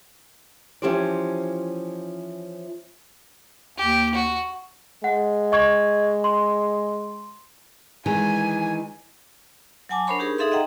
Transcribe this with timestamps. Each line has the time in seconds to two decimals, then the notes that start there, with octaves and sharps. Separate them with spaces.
0.82 E3 F3 C#4 G4 C5 D5
3.78 D#2 G4
4.14 F#4
5.04 G#3 F#5
5.52 D#5 C#6 G#6
6.24 C6
8.06 D#3 E3 G#3 G#5
9.89 F#3 F#5 G#5 A5 D6
10.07 D4 A#4 C5 C#5 B5 C#6
10.19 D#4 G4 G#4 A#4
10.38 D#4 G#4 A4 E5 F5 C6
10.51 D#5 E5 F#5 G5 A#5